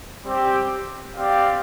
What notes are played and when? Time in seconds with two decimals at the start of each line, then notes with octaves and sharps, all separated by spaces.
0.24 G3 C4 G4
1.16 C4 G4 D5 F5